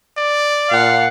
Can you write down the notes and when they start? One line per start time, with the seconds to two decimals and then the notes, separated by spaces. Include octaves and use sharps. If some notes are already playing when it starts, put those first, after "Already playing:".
0.17 D5
0.71 A#2 F5 F#5